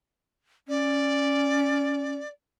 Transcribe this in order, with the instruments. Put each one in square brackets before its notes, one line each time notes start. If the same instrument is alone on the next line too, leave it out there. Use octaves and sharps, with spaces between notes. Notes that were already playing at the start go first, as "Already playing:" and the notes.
[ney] C#4 [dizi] D5